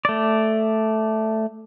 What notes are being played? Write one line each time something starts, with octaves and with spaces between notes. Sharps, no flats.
A3 D5